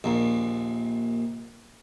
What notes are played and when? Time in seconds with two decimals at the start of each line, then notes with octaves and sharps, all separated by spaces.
0.04 A#1 D#2